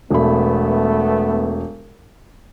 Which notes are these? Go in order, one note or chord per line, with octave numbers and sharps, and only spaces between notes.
E1 A3 B3 B5